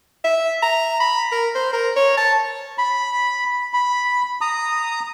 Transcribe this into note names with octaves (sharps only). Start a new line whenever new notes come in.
E5
A#5
B5
A#4
C5
A#4
C#5
A5
B5
B5
A#5 D#6